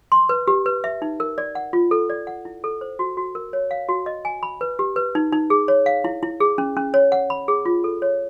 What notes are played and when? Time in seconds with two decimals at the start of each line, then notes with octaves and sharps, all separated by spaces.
0.12 C6
0.29 B4
0.47 G4
0.66 B4
0.84 E5
1.02 D#4
1.20 A#4
1.38 D5
1.55 F#5
1.73 F4
1.91 A4
2.10 D5
2.27 F#5
2.45 E4
2.64 A4
2.81 C5
2.99 F#4
3.17 F#4
3.35 A#4
3.53 C#5
3.71 F5
3.89 F#4
4.06 D#5
4.25 G#5
4.43 B5
4.61 B4
4.79 G4
4.96 B4
5.15 D#4
5.32 D#4
5.50 G#4
5.68 C#5
5.86 F5
6.04 E4
6.23 E4
6.40 G#4
6.58 C#4
6.77 C#4
6.94 C#5
7.12 F#5
7.30 B5
7.48 G#4
7.66 F4
7.84 A4
8.02 C#5